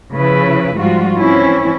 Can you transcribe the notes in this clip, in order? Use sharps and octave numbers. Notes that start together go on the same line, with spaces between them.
C#3 F3 E4 B4
G#2 F3 G3 F4 F#4
E3 C4 C#4 E4